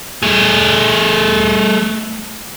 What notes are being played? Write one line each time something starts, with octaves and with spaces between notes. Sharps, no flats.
A3 G#4